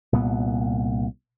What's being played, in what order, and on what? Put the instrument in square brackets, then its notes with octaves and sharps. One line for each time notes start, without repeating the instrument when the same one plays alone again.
[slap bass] C2 A#2 B3